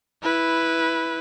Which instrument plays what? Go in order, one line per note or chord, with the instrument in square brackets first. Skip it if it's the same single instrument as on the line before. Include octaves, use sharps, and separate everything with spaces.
[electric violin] E4 B4